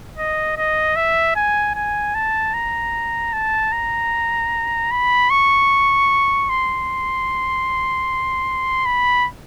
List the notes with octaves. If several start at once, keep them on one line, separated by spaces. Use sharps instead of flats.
D#5
D#5
E5
G#5
G#5
A5
A#5
A5
A#5
B5
C#6
C6
B5